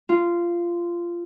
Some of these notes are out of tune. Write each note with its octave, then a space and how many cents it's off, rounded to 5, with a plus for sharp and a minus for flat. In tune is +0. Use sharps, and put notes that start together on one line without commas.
F4 -15